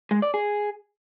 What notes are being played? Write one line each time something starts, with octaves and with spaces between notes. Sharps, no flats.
G#3
D5
G#4